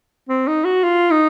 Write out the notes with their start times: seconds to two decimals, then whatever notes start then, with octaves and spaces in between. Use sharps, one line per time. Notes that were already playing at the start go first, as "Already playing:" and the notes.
0.29 C4
0.48 D#4
0.65 F#4
0.84 F4
1.11 D#4